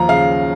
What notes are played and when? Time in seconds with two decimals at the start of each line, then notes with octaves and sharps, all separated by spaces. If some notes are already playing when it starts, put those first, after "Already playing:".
Already playing: D#2 F3 A#5
0.09 C#3 F5